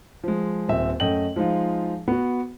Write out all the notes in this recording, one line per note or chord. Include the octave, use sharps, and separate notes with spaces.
F3 G#3
D#1 C4 E5
F#2 A3 D#5 G5 F#7
F3 G#3 D#4 F4
B3 F#4